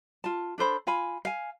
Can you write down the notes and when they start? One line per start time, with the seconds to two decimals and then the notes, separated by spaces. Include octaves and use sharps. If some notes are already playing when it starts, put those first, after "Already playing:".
0.24 F4 A5
0.58 D4 A4 C5 B5
0.87 F4 F5 G#5 B5
1.25 F5 G#5